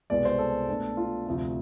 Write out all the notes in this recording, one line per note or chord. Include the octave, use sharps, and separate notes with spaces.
C2 B2 G#3 B3 D5
C5
A4
B2 A3 D4
F4
D2 C3 F3 A3